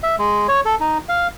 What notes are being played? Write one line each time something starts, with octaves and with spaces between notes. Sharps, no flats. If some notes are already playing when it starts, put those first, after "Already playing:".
E5
G#3
C#5
A4
D#4
F5